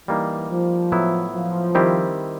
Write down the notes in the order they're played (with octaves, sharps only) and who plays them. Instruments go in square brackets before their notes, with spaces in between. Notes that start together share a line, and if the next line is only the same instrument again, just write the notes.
[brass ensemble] E3 [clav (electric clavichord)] G3 A#3 D#4
[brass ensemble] F3
[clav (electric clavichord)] A2 F#3 B3 E4
[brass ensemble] F3
[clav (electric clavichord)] D#3 G3 C4 E4 G4